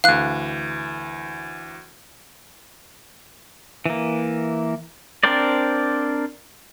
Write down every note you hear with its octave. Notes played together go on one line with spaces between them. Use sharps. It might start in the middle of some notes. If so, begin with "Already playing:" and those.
D2 E3 F5 F#6
E3 A#3
C4 D4 A#4 C5 D5